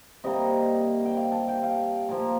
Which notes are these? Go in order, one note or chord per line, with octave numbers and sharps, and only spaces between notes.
C3 G3 A#3 D#5
G5
F5
A5
G5
F5
A#2 F3 A#3